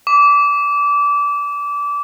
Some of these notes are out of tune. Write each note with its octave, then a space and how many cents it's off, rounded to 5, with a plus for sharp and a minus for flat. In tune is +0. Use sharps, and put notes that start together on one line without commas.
D6 -25